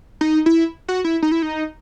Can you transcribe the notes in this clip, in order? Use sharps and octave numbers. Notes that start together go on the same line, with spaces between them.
D#4
E4
F#4
E4
D#4
E4
D#4